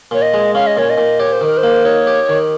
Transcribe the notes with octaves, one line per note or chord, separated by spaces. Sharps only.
A#2 C#5
D#5
G#3
C#4 F5
D#5
A#2 C#5
D#5
A#2
G4 C#5
C5
D#3 A#4
C5
A#3
D#4 C#5
G4
D#3